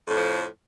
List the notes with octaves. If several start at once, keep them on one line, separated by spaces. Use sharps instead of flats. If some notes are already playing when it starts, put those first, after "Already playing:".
F2 A2 F3